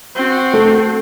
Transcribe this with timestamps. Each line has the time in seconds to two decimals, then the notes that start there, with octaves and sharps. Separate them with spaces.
0.15 C4 F#4
0.54 A3